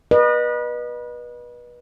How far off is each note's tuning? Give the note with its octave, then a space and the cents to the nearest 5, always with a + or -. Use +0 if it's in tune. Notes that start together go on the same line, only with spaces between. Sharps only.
B4 -30 D#5 -35